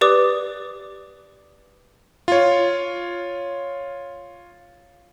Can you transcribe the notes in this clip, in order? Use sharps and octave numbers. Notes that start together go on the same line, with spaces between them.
G4 B4 D5 D6 D#6
F4 C#5